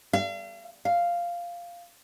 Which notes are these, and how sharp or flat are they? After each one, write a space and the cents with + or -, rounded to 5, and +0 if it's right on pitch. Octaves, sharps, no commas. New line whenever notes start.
F5 -40
F5 -5